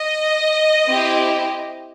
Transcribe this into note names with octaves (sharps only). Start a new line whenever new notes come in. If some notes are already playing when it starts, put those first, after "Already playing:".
Already playing: D#5
C4 E4 G4